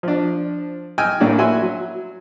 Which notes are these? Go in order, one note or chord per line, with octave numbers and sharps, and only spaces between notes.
F3 D4
D#5 G5 G#5 E6 F6
A2 F#3 A#3 C#4 D4 F#4
E4 F#4 G#5 C6 E6
F#3